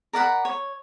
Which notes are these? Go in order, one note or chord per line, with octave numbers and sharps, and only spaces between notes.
A#4 D5 F#5 B5
C#5